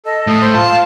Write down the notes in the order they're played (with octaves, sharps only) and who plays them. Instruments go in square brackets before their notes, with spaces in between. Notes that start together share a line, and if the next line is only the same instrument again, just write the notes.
[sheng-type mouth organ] A4 [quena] D#5
[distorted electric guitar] A2 [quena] D#6
[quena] C5
[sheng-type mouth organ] F4 [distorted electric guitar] A5
[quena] F5